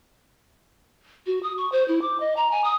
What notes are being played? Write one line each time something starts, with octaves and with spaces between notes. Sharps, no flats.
F#4
D#6
C#6
C5
E4
D6
D#5
A#5
G#5
D#6